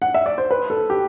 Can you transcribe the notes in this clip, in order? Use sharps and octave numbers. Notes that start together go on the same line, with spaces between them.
F#5
E5
D5
C5
B4
A4
G4